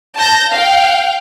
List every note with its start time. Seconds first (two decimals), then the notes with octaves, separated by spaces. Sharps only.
0.16 A5 G6 A#6
0.51 F5 G5